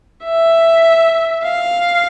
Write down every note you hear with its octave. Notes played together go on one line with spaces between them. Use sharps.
E5
F5